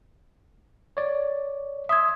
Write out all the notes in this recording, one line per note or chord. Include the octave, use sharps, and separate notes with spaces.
C#5 D5
E5 C6 D#6 E6 G#6